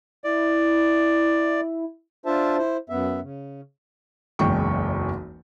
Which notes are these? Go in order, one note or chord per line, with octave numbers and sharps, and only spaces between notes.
E4 D5
D4 F4 C5 E5 A5
E4 C5
F#2 B3 E5
C#3
F#1 B1 E2 G#3 G5 C#6